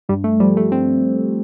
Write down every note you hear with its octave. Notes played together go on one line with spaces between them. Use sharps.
G2 G3
A3
F3 G3
A3
G2 C4